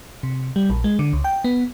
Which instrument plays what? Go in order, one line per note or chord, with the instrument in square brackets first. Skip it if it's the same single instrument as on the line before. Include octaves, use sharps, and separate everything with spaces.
[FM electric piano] C3
G3
A#1
G#3
D3
C#2
G5
B3